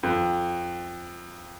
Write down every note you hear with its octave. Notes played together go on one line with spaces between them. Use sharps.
F2